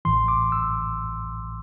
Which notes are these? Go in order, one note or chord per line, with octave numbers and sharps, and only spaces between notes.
A1 A2 E3 C6
D6
E6